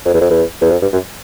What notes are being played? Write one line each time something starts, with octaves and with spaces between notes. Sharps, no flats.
F2
E2
F2
E2
E2
F2
G2
F#2